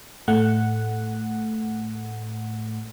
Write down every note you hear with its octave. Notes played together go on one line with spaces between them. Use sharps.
A2 A3 F#5